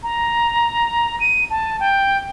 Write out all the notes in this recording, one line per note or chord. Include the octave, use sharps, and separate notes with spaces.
A#5
D#7
A5
G5